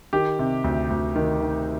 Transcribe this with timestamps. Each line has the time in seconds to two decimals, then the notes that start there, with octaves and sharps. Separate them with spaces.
0.13 D#3 G4
0.39 C3
0.64 D2
0.90 D2
1.16 D#3
1.42 D#3